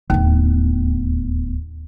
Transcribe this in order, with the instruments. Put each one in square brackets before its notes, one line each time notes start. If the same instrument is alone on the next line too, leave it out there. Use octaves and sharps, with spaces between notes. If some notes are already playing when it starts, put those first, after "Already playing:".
[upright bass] D1 B3 [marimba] D#2